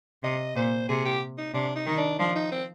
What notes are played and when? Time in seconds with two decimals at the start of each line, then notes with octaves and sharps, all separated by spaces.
0.23 C3 D#5
0.56 A#2 C5
0.89 C3 G#4
1.05 G4
1.38 D#4
1.54 C3 D4
1.75 D#4
1.87 D#3
1.97 D4
2.19 F3 D4
2.35 D#4
2.52 C4